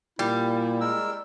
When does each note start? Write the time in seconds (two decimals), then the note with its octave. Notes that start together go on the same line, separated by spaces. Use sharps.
0.19 A#2 G3 E4 G4
0.81 G#3 A#4 E6